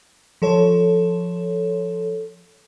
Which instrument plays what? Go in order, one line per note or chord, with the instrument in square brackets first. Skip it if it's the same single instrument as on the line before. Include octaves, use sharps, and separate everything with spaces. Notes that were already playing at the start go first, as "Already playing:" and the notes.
[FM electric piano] F3 A4 C#5